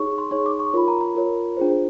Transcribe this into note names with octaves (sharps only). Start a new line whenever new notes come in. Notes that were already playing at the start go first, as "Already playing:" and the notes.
Already playing: D#4 G#4 C#5 C#6
C6
D#4 G#4 C#5 C#6
D6
C#6
F4 A#4 C#5 B5
A#5
A#5
F4 A#4 C#5
D4 F4 G#4 C5